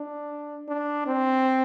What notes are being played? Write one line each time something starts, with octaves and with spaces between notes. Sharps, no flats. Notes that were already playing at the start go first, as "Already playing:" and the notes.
Already playing: D4
D4
C4